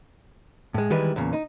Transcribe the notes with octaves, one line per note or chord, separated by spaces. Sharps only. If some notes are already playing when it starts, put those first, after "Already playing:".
A2 G#3
D#3 E3 G3 G#3 E4 B4
E2 A#2 C#3
D#4